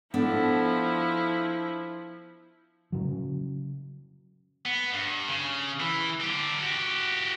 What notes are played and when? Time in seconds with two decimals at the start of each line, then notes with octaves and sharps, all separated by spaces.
0.14 F3 B3 D4 E4 A4
2.92 C#3 F#3
4.65 B3
4.93 G2
5.28 C#3
5.80 E3
6.21 D3 G4
6.61 F#4 G4